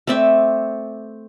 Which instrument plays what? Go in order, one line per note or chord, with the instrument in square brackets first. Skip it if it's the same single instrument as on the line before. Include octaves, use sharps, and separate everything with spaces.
[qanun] A3 C4 D5 E5